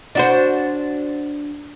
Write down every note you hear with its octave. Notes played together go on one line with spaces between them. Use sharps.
D4 F#4 C5